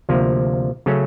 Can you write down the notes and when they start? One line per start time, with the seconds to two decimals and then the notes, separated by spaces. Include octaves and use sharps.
0.09 D2 C3 F3 A#3
0.86 C#3 F#3 A3 C#4